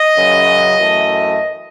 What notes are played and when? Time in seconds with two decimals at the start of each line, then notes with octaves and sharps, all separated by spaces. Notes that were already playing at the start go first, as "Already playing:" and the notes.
Already playing: D#5
0.16 F#2 C#3 F#3
0.78 F#2 E3 A3